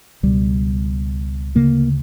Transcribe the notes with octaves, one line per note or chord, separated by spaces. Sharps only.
C#2 B2 G3
D2 C#3 A#3